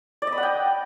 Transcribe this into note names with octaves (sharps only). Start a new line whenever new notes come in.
D5
D#5
B5
F#5
G5